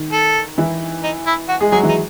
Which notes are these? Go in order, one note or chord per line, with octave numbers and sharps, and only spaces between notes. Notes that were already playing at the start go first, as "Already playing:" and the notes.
Already playing: D#3
A4
E3 E4
D#4
E4
F#4
G#3 G#4
F#3 F#4 G#4
E3 E4
D#4